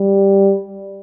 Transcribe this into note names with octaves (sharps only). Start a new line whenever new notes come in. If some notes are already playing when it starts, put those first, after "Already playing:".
Already playing: G3